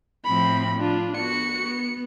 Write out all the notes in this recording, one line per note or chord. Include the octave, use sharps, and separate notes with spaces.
A2 F3 C4 B5
D4 F4
B3 F#4 C#7
B3